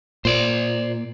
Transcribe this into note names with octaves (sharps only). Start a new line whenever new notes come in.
A#2 C5 D5